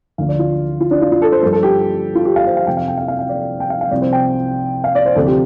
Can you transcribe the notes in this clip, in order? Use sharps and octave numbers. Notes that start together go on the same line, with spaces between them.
D2 D3 F3 F5
D5
F4
F4
D4
F4
F4
A4
C5
G2 F3 A4
A4
G4
F4
G4
F5
C5
F5
F2 C3 F3 G5
F5
G5
F5
F5
F5
D5
G5
F5
F5
C2 C3 F3 D5
C5
G5
F5
D5
C5
D2 C3 F3 A4
G4